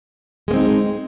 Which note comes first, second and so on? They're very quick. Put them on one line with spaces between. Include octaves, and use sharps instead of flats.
G#3 A#3 C4 D#4